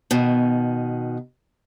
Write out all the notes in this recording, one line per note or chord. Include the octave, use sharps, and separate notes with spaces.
B2 D#3